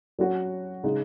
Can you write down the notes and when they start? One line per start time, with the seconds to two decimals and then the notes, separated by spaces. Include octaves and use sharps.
0.19 F#3 C#4 F#4
0.83 C#3 G#3 D#4